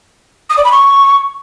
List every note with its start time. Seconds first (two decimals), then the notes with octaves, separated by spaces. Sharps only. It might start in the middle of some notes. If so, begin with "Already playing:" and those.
0.50 D#6
0.57 D5
0.64 B5
0.72 C#6